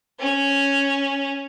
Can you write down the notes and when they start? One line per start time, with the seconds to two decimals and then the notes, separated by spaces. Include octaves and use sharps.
0.20 C#4